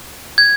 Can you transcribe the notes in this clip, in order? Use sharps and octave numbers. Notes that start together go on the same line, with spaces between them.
G#6